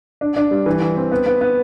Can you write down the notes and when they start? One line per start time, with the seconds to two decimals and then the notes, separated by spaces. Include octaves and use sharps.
0.21 D4
0.36 D4
0.51 G3
0.66 E3
0.81 E3
0.97 C4
1.11 B3
1.26 B3
1.41 B3